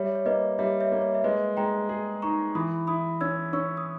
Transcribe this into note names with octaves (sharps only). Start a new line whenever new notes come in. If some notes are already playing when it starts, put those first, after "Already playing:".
Already playing: G3 C#5 E5
C#5
A#3 B4 D#5
G3 C#5 E5
C#5 E5
A#3
C#5
E5
G#3 B4 D#5
G#3 G5 A#5
G#4
D#4 A#5 C#6
E3 B5 D#6
E4 B5 D#6
C#4 E6 G#6
C#4 C#6 E6
D#6